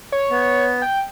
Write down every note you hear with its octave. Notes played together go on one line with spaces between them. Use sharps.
C#5
B3
G5